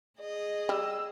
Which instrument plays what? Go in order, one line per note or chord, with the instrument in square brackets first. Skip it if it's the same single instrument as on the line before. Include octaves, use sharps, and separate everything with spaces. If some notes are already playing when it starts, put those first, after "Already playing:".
[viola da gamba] G#4 [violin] D#5
[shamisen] G3 [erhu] E6